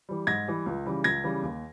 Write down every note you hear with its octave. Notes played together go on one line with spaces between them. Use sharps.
E3 G3
G#2 G#6 A#6
E3 G3
C#2
C#3 E3 G3
C#2 G#6 A#6
C#3 E3 G3
D#2